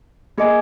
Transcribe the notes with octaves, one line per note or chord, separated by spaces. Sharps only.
A#3 G#4 D#5 G#5